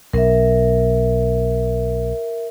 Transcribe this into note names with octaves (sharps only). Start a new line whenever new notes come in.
B1 A#4 E5